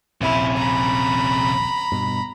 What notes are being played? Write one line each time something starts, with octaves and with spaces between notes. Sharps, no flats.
D#1 A#1 C3 C#4 E4
A#5 B5
G2 B2